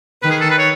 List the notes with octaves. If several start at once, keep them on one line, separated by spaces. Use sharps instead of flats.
D#3 B4
G#4
A4
B4
C#5